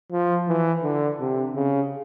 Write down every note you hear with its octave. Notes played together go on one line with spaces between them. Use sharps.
F3
E3
D3
C3
C#3